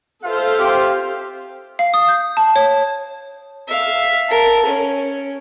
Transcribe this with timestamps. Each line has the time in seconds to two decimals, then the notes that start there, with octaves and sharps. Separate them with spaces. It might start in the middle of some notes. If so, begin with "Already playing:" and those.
0.24 F4 A4 C5 E5 F5
0.59 C4 G4
1.79 F5
1.94 D#6
2.08 G6
2.37 A5
2.56 C#5
3.68 E5 F5
4.29 A#4 A5
4.65 C#4